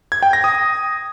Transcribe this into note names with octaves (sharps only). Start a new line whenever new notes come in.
G#6
G5
A#6
D#6